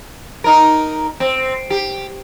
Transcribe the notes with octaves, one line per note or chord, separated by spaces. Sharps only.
D#4 A#4
C4
G4